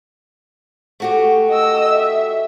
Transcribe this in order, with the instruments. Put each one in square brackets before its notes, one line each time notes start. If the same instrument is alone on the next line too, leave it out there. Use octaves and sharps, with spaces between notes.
[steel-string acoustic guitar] A3 F#4 G4
[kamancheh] D#5 E6
E5